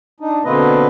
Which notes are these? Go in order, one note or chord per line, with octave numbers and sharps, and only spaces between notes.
D4 D#4
B2 D3 A#3 C4 B4 D#5